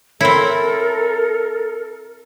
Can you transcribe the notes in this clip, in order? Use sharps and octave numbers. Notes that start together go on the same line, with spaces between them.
C4 E4 A4 A#4 C#5 E5 B5